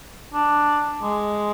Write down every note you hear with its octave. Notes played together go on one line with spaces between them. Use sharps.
D4
G#3